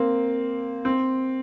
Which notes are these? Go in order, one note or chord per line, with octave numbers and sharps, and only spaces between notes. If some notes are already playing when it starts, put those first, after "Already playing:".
Already playing: A#3 C4
C4